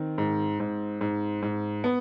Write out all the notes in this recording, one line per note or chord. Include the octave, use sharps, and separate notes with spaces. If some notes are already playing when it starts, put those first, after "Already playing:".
Already playing: D#3 C4
G#2
G#2
G#2
G#2
B3